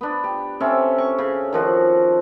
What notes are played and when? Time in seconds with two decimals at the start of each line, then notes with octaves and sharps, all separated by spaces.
0.01 B3 D4
0.24 G4
0.60 C4 C#4 A4 E5
0.98 C#6
1.18 C#3
1.52 D#3 F3 F#4